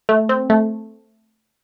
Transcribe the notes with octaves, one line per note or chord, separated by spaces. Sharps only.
A3
C4
A3